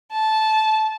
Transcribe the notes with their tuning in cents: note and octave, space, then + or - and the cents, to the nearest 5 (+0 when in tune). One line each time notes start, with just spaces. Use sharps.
A5 -15